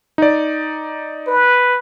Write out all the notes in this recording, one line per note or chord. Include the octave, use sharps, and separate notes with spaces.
D#4 D5
B4